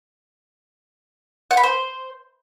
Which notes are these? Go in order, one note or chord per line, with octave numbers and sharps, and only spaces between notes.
F#5
B5
C5